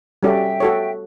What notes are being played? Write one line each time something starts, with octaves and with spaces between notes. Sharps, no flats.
G3 C#4 F#4 A4 D5 E5 G5
F#4 A4 C#5